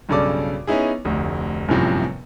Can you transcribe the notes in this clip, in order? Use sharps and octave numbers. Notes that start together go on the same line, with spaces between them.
B1 G2 C#3 A4 D5 D6
B3 C#4 D#4 E4 G#4
F1 D2
G1 F#2 A2 C3 F3